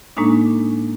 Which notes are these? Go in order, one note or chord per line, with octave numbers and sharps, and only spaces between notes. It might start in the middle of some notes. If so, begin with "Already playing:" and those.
A2 G#3 A#3 D4 D#4